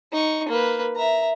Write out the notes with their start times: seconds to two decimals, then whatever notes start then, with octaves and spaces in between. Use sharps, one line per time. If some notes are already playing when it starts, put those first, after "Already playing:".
0.13 D#4 C#6
0.48 A#3 B4
0.97 E5 A#5